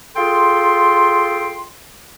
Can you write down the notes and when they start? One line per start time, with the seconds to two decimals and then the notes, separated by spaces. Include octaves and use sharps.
0.16 F4 G#4 A4 G5 C6